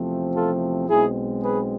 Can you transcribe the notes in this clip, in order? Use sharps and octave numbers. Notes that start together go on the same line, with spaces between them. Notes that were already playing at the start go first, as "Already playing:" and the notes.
Already playing: E2 C3 F3 A3 C4
F4 A4
B1 B2 G#3 C4 E4 G#4
G#4 B4